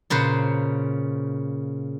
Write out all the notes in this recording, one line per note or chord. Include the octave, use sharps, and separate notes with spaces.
A#2 C#3 B4 C5